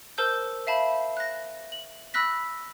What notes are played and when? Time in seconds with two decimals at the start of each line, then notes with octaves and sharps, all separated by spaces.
0.18 A#4 C5 A5 E6 G6
0.67 E5 F5 A5 B5
1.17 F#6 A#6
1.72 F#7
2.14 B5 E6 F#6 A#6 B6